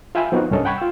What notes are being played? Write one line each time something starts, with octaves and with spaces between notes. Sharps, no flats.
F4 E5 G5 G#5 B5 E6
F3 B3 D#4 F4 F#4
C2 G2 C#4 A4 D#5
F#5 G5 B5 C#6 G#6
F4 E6